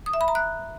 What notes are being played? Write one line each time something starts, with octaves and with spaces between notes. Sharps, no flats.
D#6
E5
B5
A#5
F#6